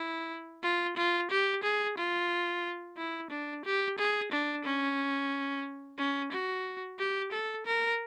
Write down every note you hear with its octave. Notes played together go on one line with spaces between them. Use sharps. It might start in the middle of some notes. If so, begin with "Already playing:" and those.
Already playing: E4
F4
F4
G4
G#4
F4
E4
D4
G4
G#4
D4
C#4
C#4
F#4
G4
A4
A#4